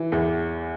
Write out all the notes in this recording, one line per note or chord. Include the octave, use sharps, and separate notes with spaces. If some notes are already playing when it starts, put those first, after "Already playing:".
Already playing: E3
E2